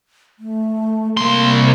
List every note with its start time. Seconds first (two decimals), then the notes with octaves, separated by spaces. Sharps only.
0.39 A3
1.17 C2 A#3 C6